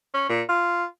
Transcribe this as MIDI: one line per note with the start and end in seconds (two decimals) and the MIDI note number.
0.14 0.26 61
0.29 0.42 46
0.49 0.85 65